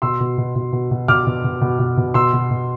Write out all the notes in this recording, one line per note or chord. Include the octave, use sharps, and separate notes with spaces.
B2 C6 E6
B2
B2
B2
B2
B2
B2 D6 F6
B2
B2
B2
B2
B2
B2 C6 E6
B2
B2